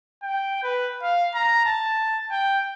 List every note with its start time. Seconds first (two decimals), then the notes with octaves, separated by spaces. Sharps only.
0.23 G5
0.63 B4
1.03 F5
1.35 A#5
1.66 A5
2.31 G5